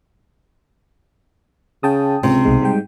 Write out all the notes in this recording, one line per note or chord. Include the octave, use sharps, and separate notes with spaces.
C#3 G5 A5 D#6
C#2 C3
C2 G#2 B2 G#3
G3 G#3 G5